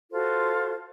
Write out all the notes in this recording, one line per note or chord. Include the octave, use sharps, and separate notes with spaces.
F4 F#4 A4 C5